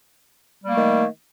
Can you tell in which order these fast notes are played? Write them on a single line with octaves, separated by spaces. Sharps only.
G3 A#3 A3 D#3